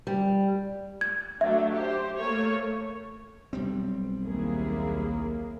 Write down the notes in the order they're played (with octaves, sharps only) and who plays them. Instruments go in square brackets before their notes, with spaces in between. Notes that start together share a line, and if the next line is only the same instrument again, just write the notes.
[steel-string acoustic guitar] G3
[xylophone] G#6
[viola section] F#3 A3 D4 [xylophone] E5
[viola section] G4 C5
A3 A#3 C#5
[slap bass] B1 G3 C4
[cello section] D#2 E4 G#4 [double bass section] A#3